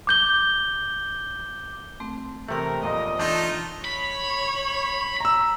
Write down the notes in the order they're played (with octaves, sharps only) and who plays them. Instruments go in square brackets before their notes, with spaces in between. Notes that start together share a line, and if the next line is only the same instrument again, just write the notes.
[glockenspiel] D6 G6 G7
[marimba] A3 C4
[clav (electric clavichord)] C3 A3 [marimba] E3 G5 [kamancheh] A#4
[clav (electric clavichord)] F2 A#2 [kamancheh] D#5
[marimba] E3 [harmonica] A3 D#4 F4 [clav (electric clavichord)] D4
[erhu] C#5 [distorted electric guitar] B5
[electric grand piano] A#5 E6